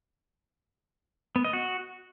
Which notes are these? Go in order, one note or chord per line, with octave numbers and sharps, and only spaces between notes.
B3
D#5
F#4